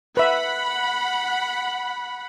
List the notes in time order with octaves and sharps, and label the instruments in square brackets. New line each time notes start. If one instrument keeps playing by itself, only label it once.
[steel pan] B4 E5 [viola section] F#5 B5